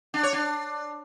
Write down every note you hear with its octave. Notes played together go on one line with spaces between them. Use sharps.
D4
C#5
D4